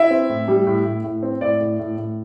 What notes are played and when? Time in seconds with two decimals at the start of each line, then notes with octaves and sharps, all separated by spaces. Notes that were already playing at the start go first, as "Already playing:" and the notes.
Already playing: E4 E5
0.10 C4
0.29 A2
0.48 G3
0.67 A2
0.85 A2
1.04 A2
1.23 C4
1.41 A2 D5
1.60 A2
1.79 A2
1.98 A2